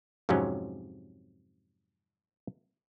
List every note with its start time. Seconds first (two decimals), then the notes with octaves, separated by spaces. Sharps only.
0.29 F2 G#2 C3 F#3 C#4